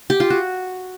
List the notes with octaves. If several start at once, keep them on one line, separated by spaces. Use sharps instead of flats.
G4
F4
F#4